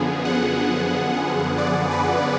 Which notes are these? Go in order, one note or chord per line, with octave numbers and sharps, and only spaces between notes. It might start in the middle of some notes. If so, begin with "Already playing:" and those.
Already playing: F#2 D3 F3 B3 G#4
F#5
D5
B4